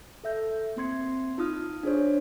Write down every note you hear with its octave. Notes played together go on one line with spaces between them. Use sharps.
A4 E5 G6
A#3 C4 C6 G#6 C#7
D#4 F4 D#6 F6
D4 G#4 C5 C#5